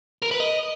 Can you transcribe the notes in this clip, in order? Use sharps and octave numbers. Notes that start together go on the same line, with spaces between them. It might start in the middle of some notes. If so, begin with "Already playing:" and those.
A#4
B4
D#5